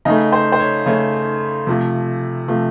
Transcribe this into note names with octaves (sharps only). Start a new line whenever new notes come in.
C#3 A3 D#4
C5
C5
C#5
C#3 A3 C#5
C3 F3 A3
C3 F3 A3